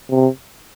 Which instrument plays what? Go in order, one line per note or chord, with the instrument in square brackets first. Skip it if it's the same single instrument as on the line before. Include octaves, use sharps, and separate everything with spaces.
[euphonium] C3